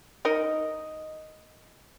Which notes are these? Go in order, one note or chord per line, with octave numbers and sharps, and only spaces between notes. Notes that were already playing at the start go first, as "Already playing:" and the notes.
D#4 A#4 D#5